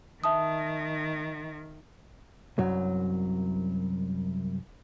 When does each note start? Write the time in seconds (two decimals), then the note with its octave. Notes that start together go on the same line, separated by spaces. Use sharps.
0.24 D#3 E5 A5 D#6
2.58 C2 F#2 F#3